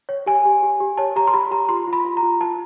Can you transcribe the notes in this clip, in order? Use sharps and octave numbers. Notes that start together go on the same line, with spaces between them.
C#5
G4 G#5
G4
G4
G4
C#5 A5
G4 A#5
C6
G4 B5
G4 A#5
F4 C6
F4
B5
F4
A#5
F4
F4 A5